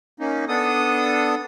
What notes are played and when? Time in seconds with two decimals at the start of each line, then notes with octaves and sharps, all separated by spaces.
0.20 A#3 C#4 D#4
0.48 B3 D4 A4 D#6